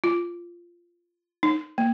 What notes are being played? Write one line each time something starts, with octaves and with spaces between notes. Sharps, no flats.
F4
D#4
A#3